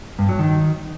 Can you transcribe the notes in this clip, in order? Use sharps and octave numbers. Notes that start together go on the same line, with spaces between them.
G2
F#3
D#3